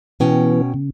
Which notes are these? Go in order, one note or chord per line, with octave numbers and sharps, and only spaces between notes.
B2 E3 B3 C#4 G5
C#3